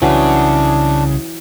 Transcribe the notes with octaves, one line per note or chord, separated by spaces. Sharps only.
C2 C#3 E3 F#3 D4